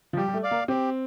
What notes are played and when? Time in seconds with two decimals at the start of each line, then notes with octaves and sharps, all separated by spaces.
0.13 F3
0.17 G3 G4
0.28 G3
0.34 A3
0.43 D5 F5
0.51 A#3
0.68 C4 G4